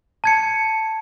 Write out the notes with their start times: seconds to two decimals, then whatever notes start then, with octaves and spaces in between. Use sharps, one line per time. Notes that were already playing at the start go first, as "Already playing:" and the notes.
0.24 A5 G#6 C#7